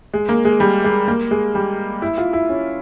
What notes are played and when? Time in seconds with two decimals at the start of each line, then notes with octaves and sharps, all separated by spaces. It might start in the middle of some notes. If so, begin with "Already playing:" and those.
0.14 G#3
0.29 A#3
0.45 G#3
0.60 G3
0.84 G#3
1.08 A#3
1.31 G#3
1.55 G3
2.02 E4
2.18 F4
2.33 E4
2.49 C#4